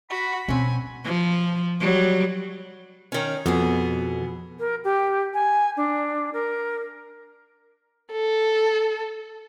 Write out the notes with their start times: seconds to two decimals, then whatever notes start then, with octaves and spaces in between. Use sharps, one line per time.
0.10 F#4 F#5 B5
0.48 B2 C4 C#4 G#5
1.05 F3
1.81 F#3 G3
3.12 D#3 C#4
3.46 F2 B2 B3 G#4
4.59 A#4
4.84 G4
5.34 G#5
5.77 D4
6.33 A#4
8.11 A4